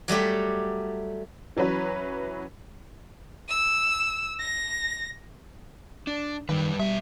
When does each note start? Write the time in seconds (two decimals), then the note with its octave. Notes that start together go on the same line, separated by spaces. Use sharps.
0.08 F#3 G3 A3 G4
1.57 E3 F#3 C#4 B4 C#5
3.49 E6
4.40 A#6
6.07 D4
6.49 F#2 D#3 G3 B4
6.79 B2 G3 E5